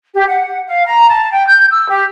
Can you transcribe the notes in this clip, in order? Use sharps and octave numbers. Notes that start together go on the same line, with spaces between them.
G4
F#5
F5
A#5
A5
G5
G6
E6
G4